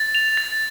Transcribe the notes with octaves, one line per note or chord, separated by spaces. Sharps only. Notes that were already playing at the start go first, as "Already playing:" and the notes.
Already playing: A6
F7
A6